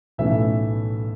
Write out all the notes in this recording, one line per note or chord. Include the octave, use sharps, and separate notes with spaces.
B1 A2 E3 A3 C#4 E5